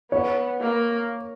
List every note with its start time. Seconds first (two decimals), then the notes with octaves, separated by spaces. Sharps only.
0.12 B3 C#5
0.61 A#3